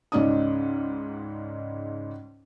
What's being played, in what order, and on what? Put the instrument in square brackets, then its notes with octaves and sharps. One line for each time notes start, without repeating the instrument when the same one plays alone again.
[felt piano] C#2 G#2 C#4 D#4 D5 D#6